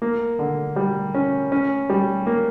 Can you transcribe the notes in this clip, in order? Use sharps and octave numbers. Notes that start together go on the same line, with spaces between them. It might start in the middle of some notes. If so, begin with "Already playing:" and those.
A#3
D3
G3
C#4
C#4
G3
A#3